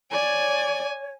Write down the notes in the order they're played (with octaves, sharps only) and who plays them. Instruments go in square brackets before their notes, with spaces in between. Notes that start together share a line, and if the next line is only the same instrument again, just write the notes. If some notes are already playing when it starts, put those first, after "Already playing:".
[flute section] C#5 [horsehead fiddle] D5 [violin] G#5